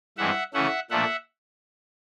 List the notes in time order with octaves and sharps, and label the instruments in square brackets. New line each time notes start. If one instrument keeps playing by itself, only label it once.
[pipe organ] G2 E3 G#3 C4 E5 F#5
C#3 E3 A3 C#4 E5 F#5
A#2 F3 A3 D4 E5 F#5